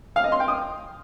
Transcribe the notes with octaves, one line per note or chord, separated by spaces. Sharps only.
F5
D#5
C6
G5
D#6